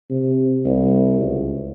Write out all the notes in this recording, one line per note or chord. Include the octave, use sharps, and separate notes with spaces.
C3
C2
C#2